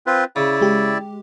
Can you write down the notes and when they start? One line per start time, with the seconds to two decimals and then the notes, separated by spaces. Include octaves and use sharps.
0.07 C4 F4 B4
0.36 C#3 E4 D5
0.61 G#3 G4